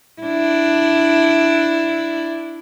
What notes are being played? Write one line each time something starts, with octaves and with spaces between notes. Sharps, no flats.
D4 E4